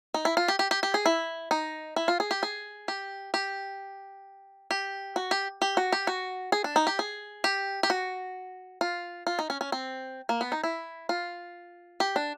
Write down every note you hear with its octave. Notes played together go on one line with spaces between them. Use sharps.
D#4
E4
F4
G4
G4
G4
G4
G#4
E4
D#4
E4
F4
G#4
G4
G#4
G4
G4
G4
F#4
G4
G4
F#4
G4
F#4
G#4
D4
D#4
G4
G#4
G4
G4
F#4
F4
F4
D#4
C#4
C#4
C4
A#3
B3
D#4
E4
F4
G4
D4